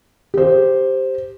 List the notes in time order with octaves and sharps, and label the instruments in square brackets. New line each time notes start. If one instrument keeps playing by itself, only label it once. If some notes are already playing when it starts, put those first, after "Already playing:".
[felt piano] G4 C5